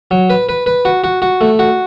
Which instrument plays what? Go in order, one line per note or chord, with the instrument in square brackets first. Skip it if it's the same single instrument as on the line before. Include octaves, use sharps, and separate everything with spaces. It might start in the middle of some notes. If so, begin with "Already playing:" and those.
[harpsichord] F#3
B4
B4
B4
F#4
F#4
F#4
A3
F#4